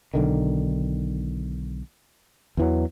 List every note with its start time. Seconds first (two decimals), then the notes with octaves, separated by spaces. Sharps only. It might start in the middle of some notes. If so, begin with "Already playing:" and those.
0.14 B1 D3 D#3
2.57 E2 E3 F#3